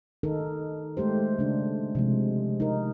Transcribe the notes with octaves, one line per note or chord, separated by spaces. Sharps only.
D#3 D#4 A4 A#4
G#3 A3 G4 C5
C#3 D4
C3 F3 G#3
D#4 A#4